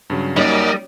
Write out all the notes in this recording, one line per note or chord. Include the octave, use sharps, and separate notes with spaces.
G2 C#3 F#3
F#2 G3 A#3 D#4 A#4 D5 D#5